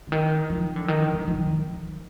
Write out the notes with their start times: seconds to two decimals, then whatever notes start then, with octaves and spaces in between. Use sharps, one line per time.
0.07 D3
0.12 D#3
0.50 F3
0.76 D3
0.88 D#3
1.14 F3
1.27 F3
1.39 D#3